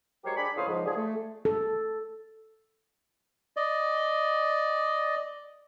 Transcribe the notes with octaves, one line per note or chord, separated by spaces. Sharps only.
F#3 G#3 G4 A#4 C5 C#5
D4 G#4 D5 G5 B5
C#2 A2 C5 C#5 F5 D#6
C#2 G#2 F3
D3 F3 D4 G#4
A3
A4
D5 D#5